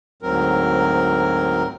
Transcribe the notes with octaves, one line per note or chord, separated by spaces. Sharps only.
D2 G#2 F#3 C4 A#4